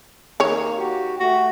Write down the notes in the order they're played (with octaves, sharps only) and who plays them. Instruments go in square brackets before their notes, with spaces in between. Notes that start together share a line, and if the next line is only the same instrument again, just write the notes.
[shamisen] D#3 C#5 [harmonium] A#3
[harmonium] F#4 G4
[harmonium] A3 [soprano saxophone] F#4